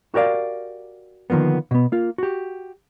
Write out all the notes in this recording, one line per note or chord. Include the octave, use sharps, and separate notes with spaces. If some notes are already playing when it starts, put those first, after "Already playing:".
F#4 G4 A#4 D5 F5
D3 D#3 F3 A#3 B3
B2 B3
A#3 F4
F#4 G4